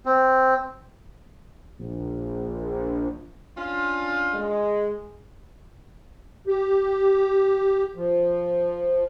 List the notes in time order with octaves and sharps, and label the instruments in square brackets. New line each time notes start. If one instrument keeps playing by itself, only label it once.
[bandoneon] C4
[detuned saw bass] A#1
[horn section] C#4 D4 F4
[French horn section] G#3
[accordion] G4
F3